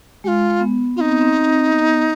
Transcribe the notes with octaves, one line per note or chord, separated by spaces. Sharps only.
G#3 F4 G4
G#3
B3
C4 D#4 F4
B3
C4
B3